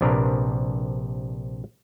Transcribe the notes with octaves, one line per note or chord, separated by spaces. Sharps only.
A#1 C3 D4 A#4 B4